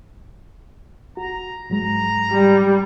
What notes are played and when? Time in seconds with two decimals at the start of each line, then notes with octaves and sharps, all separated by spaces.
1.17 F#4 A#5
1.70 G#2 F#3 G#3 A#5
2.32 G3